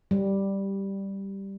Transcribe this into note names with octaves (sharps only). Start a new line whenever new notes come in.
G3